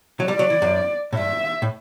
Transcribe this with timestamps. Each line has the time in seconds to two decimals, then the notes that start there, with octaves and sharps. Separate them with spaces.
0.20 F#3
0.28 G3 D5
0.39 F#3
0.50 E3
0.62 F#2
1.13 A2
1.17 G2 E5
1.62 A2